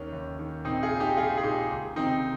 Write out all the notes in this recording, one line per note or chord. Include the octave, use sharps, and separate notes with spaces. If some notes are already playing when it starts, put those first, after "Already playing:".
Already playing: D#2 D#3 C#4
D#2
D#3
A#1 C4 D#4
F4 G#4
A#2
D#4 G4
A#1 F4 G#4
G#4
A#2 D#4 G4
C#2
C3 D#3 C4 D#4